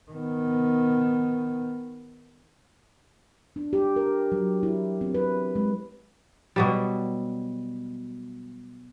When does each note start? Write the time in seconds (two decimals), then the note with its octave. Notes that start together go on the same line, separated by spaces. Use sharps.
0.12 D#3 B3
3.56 D4
3.73 G4
3.96 A#4
4.32 F#3
4.63 E4
5.01 C4
5.15 B4
5.56 G#3
6.56 B2 F#3 G3